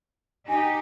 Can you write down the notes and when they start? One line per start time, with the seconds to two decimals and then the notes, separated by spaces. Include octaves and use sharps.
0.48 D#4 G4 G#5